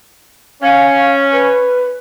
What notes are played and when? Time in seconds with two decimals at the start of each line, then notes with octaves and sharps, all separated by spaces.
0.63 C#4 F5
1.32 B4